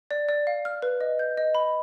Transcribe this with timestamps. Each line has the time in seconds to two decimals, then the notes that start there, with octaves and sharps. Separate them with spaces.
0.11 D5
0.29 D5
0.47 F5
0.65 F6
0.82 B4
1.01 D#5
1.19 G6
1.37 D#5
1.55 B5